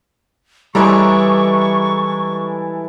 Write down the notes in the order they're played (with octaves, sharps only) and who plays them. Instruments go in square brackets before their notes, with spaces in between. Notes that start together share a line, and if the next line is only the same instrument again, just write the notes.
[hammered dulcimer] E3 G#3 D5 [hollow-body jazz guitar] G3 [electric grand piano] E4 A4 A#5 [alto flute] C#6